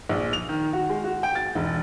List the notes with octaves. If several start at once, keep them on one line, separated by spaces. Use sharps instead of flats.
A#1
F7
D#3
F#4
G#3
F#4
G5
A6
E1